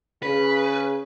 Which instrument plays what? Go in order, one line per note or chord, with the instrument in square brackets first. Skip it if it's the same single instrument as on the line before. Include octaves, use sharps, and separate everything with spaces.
[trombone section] C#3 [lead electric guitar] B4